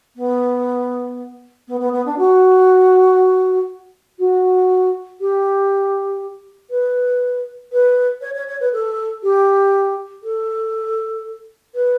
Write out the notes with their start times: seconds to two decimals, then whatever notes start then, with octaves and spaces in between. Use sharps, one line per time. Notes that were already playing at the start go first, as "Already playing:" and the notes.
0.16 B3
1.68 B3
1.80 B3
1.93 B3
2.06 D4
2.18 F#4
4.19 F#4
5.20 G4
6.70 B4
7.72 B4
8.21 C#5
8.35 C#5
8.48 C#5
8.60 B4
8.73 A4
9.23 G4
10.23 A4
11.75 B4